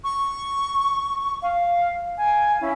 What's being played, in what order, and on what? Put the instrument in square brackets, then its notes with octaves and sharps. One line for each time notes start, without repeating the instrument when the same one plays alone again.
[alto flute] C#6
[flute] F5
[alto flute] F5 [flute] G#5
[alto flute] C#4 [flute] E4